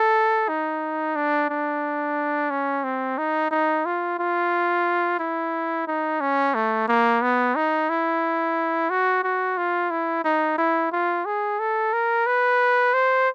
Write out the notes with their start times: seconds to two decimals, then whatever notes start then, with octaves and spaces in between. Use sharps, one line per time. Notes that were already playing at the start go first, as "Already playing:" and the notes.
Already playing: A4
0.49 D#4
1.16 D4
1.50 D4
2.50 C#4
2.84 C4
3.18 D#4
3.51 D#4
3.86 F4
4.19 F4
5.20 E4
5.87 D#4
6.21 C#4
6.55 A3
6.88 A#3
7.22 B3
7.56 D#4
7.90 E4
8.90 F#4
9.24 F#4
9.58 F4
9.91 E4
10.24 D#4
10.58 E4
10.92 F4
11.26 G#4
11.59 A4
11.93 A#4
12.27 B4
12.94 C5